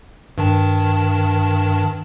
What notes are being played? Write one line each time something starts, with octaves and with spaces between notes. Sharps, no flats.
G2 D#3 A5